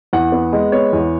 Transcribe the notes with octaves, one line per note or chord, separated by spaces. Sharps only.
E2 F#5
B3
G#3
B3 C#5
E2